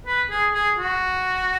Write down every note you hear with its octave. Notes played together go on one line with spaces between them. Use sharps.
B4
G#4
G#4
F#4